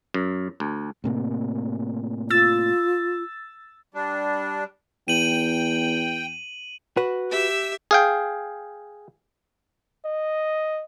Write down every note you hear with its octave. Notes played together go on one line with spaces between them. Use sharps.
F#2
D2
A2 C3 A#3
F4 E6 A6
G3 D4
E2 G5 D#7 F#7
F#4 B4
G4 E5 E6
G#4 F5 G5
D#5